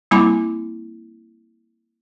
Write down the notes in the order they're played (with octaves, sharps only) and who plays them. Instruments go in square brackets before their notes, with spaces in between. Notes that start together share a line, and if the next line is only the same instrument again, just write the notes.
[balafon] G3 A#3 C4 E4 B5 D6